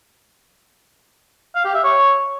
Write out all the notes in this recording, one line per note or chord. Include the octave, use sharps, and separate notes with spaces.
F5
G4
E5
C#5